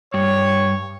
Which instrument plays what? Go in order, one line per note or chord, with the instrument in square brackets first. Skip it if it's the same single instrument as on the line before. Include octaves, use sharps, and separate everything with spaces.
[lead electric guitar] G2 [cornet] C#5